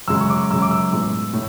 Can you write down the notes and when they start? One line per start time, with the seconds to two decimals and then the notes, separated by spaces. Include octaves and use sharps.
0.08 F#2 C#3 G#3 E6
0.20 C#6
0.30 D6
0.50 F#2 C#3 G#3 E6
0.62 D6
0.71 E6
0.93 A2 G#3 B3
1.33 A2